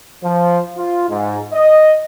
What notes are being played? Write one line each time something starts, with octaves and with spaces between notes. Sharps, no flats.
F3
F4
G#2
D#5